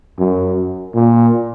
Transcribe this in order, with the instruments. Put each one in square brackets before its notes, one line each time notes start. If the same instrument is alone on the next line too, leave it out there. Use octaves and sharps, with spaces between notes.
[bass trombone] F#2
A#2